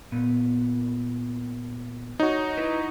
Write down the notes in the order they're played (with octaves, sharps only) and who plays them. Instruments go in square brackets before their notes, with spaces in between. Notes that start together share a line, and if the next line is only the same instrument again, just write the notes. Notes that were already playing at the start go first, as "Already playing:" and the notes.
[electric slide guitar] A#2 B3
[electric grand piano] D#4 F#4 [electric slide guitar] C#5
[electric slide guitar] E4 B4